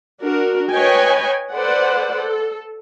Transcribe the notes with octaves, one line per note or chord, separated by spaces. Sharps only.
D4 F#4 A#4
B4 C#5 D#5 G5 G#5
A4 B4 C5 D5 F#5
A4